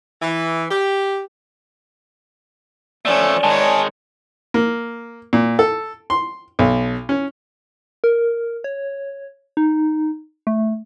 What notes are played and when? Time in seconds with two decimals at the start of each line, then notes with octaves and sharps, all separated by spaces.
0.22 E3
0.71 G4
3.05 F3 A3 C#4 A4 D5
3.44 D#3 G#3 D#4 C#5 G#5 A5
4.54 A#3
5.33 A#2
5.59 A4
6.10 C6
6.59 B1
7.09 C#4
8.04 A#4
8.64 C#5
9.57 D#4
10.47 A3